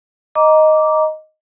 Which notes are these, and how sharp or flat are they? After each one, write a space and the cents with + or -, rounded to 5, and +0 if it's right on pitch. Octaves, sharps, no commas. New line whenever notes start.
D#5 +0 A#5 +10 D6 -10